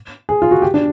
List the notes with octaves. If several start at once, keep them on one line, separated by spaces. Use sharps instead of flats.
G#4
F4
F#4
G4
D4